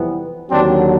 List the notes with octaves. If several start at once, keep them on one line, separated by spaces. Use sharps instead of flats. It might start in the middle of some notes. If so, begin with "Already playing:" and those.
Already playing: F2 C3 E3 G3 B3
D#2 D3 F#3 C4 D4